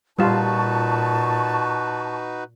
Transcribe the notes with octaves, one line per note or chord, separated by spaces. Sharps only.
A#2 G3 D#4 F4 F#4 B4 A5 C#6